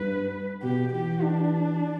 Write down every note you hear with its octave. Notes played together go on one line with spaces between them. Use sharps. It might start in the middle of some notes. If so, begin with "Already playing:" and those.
Already playing: G2 B4
B2 G4
E3 G4
D4